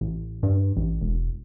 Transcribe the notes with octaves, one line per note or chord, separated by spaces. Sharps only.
A1
G2
A1
E1